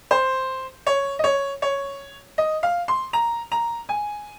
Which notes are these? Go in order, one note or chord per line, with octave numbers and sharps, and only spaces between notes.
C5
C#5
D#5
C#5
C#5
D#5
F5
C6
A#5
A#5
G#5